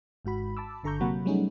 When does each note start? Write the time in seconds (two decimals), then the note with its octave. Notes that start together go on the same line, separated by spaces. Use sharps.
0.25 G#1 G#2 F#4 B5
0.57 A5 B5 D6 E6
0.84 G1 D3 A4 A#5 C#6 G6
1.00 C3 F#3 A#3 F#5 B5
1.25 F#3 G3 A3 C#4 D#4 G#4